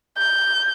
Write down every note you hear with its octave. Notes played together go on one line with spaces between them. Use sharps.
G6